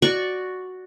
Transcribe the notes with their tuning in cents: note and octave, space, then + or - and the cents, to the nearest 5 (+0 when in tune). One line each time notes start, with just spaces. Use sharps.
F#4 +0 D5 +0 C#6 +0